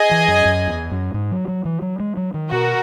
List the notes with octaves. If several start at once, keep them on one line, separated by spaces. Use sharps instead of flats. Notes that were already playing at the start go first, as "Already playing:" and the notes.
Already playing: G#4 D#5 G#5
E3
F#2
F#2
E2
F#2
G#2
F#3
F#3
E3
F#3
G#3
F#3
D#3
B2 F#4 A#4